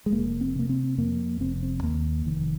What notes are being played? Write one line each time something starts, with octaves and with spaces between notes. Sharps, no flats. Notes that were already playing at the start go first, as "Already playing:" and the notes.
G#3
F1 A#3
C4
C3 A#3
C4
F2 A#3
F1 C4
C4
D#2 A#3
F1 D#3